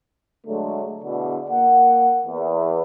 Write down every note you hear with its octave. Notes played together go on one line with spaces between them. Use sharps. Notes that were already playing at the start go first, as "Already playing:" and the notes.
D3 F#3 G#3 A3
E2 B2 D3
A#3 F#5
E2